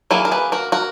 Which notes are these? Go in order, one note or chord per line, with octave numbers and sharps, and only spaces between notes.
D#3 F#3 A#3 E4 G#4
A#4
G#4 B4
F#4 A#4
F#4 A#4